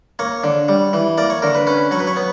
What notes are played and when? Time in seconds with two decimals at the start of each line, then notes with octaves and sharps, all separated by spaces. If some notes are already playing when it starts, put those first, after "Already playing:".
0.19 A#3 C#5
0.44 D3
0.68 G3
0.93 E3
1.18 A#3 D5
1.30 C#5
1.42 D3 A#4
1.55 B4
1.67 C#4 B4
1.91 F#3 C#5
1.99 B4
2.07 C#5
2.16 B3